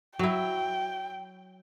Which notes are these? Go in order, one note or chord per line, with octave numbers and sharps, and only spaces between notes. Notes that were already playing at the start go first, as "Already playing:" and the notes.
F#3 E4 G5